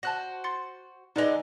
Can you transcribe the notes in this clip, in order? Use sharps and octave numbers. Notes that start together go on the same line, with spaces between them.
F#4 C5 A5 F#6 A#6
C6 A6 C#7
D3 D#3 G#3 D#4 B4 D#5